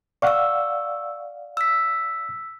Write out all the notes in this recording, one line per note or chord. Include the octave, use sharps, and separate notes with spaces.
D5 F5 F#5 C#6 E6
E6 B6